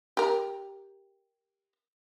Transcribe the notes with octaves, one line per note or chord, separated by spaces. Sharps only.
G4 A#4